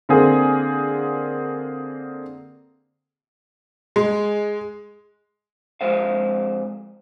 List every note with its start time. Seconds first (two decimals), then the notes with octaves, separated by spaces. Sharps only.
0.09 D3 A#3 C4 G#4
3.96 G#3
5.81 F2 G#3 C5 F5